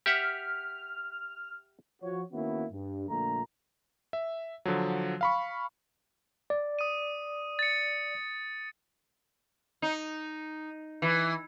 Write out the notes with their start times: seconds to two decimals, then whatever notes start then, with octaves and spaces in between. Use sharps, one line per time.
0.06 G4 E5 F#5 F6
2.02 F3 F#4 C#5
2.32 D#3 A#3 B3 C#4 E4 F#4
2.71 G2
3.09 A#1 A#2 D3 A3 A#5
4.13 E5
4.65 D3 F3 F#3
5.21 F5 B5 C#6
6.50 D5
6.79 D#6 D#7
7.59 A6 C#7
9.82 D#4
11.02 E3